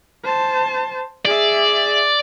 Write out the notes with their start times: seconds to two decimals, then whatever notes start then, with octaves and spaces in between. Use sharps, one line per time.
0.24 C5 A5
1.25 G#4 D5 E5